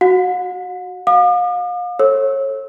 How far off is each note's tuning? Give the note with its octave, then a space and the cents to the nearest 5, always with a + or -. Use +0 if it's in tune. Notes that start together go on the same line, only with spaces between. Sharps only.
F#4 +0 F#5 -45
F5 +35 D6 +45
A4 +0 C#5 -30 E6 -20